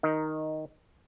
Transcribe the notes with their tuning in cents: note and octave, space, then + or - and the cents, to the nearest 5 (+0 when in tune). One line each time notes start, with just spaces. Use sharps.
D#3 +0 D#4 +0